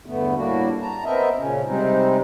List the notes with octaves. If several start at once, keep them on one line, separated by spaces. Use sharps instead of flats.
E2 G2 D3 A3 B3
A2 G3 A#3 D4 F#4
A5 A#5
B3 C4 A#4 D#5 E5
A#2 C#3 C#4
C3 G3 G#3 C4 D#4